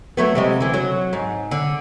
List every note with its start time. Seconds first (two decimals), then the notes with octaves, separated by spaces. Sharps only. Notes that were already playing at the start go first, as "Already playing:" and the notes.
0.17 F#3 A3 B3
0.35 C3 G3 G#3
0.60 D3 E3
0.74 F#3
1.13 G#2
1.51 D3